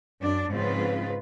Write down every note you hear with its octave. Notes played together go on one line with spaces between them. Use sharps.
F#2 D4
G#2 C#3 F3 C4 F4 B4